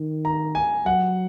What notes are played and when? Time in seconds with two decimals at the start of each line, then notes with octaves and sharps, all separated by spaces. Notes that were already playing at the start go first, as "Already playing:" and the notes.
Already playing: D#3
0.25 A#5
0.55 G#5
0.86 F#3 F#5